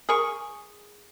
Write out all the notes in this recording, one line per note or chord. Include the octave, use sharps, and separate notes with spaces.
G#4 A#4 C#6